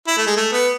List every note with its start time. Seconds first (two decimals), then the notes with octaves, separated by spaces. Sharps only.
0.07 E4
0.18 A3
0.27 G#3
0.37 A3
0.52 B3